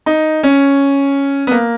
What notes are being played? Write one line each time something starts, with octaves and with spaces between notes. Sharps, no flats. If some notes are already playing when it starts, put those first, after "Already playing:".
D#4
C#4
B3
A#3